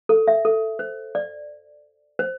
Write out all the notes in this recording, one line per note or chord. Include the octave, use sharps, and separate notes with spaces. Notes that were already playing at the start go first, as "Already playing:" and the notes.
A4
E5
A4
C5
D5
C5